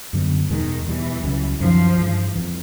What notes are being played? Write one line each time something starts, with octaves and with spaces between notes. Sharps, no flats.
F#2 D3 G3 B3
E2 B2 D#3 G#3
E2 B2 E3 G3
C#2 C#3 F#3
F#2 D#3 F3 F#3
G2 E3 G#3
F2 C#3 E3